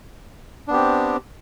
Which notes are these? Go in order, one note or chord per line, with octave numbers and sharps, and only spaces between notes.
B3 C4 D4 G4